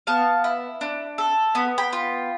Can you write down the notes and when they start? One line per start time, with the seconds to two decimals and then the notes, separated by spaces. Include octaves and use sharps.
0.07 B3 F5 A5
0.44 E4
0.81 D4
1.18 A4
1.55 B3 B5
1.78 G5 B5
1.93 F4